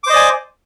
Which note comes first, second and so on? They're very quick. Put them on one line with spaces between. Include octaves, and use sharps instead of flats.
D6 C5 D#5 D5 G#5